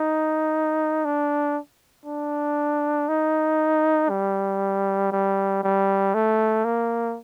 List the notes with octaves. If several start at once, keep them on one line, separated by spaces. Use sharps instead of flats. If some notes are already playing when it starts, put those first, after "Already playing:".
Already playing: D#4
D4
D4
D#4
G3
G3
G3
A3
A#3